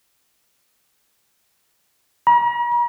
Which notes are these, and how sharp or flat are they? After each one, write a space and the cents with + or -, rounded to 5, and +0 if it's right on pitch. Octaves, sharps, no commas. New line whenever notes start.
A#5 +45